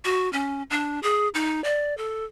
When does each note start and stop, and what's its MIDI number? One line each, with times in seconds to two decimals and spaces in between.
0.05 0.31 66
0.33 0.63 61
0.70 1.00 62
1.03 1.29 68
1.34 1.63 63
1.64 1.96 74
1.97 2.24 69